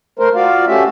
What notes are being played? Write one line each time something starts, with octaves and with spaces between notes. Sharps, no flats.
A3 A#4 C5
F4 F#4 D5 F5
A3 C#4 F#4 G4 E5